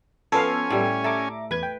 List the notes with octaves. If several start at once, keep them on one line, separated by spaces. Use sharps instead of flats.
F3 B3 C#4 A4 F5 G#5
A2 G3
A4 E5 A#5 D6
E2 B4 G#6
G5